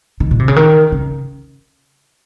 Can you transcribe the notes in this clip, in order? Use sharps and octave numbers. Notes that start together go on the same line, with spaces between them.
D#3
A#2
C3
C#3
D#3
C#3